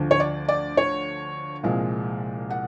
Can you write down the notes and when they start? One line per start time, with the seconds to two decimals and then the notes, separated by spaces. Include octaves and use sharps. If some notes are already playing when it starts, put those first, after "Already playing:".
Already playing: D2 D3 F3
0.11 C#5
0.20 D5
0.49 D5
0.77 C#5
1.63 C2 A#2 F3 G#3
2.50 F#5